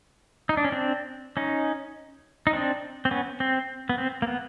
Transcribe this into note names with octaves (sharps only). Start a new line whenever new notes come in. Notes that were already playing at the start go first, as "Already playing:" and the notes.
D#4
D4
C#4
C4 D4
C#4 D#4
D#4
C4 D4
C4
B3 C#4
C4
B3
C4
A#3
B3